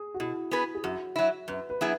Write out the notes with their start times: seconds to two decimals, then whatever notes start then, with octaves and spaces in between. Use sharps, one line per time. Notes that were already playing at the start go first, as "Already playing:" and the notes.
Already playing: G#4
0.14 F#4
0.20 B2 E4
0.51 B3 G#4 B4
0.75 G#4
0.84 F#2 F#4
1.16 F#3 E4
1.48 F#2 B4
1.70 B4
1.81 F#3 B3 E4 G#4